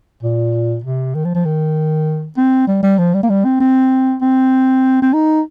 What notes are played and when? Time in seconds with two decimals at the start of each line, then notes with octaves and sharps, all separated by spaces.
0.23 A#2
0.84 C3
1.15 D#3
1.25 F3
1.35 F3
1.45 D#3
2.37 C4
2.68 G3
2.83 G3
2.98 F3
3.14 G3
3.23 A#3
3.30 G3
3.45 C4
3.60 C4
4.22 C4
5.02 C4
5.13 D#4